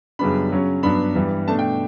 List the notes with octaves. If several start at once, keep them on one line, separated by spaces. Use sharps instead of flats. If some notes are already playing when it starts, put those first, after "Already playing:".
F#2 C#3 G3 B3 D4 B5
C#3 F#3 C#4
G2 F#3 B3 D4 B5
G2 E3 G3
B2 A3 D4 A5
G5